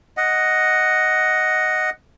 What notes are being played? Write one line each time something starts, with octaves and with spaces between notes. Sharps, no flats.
D#5 F#5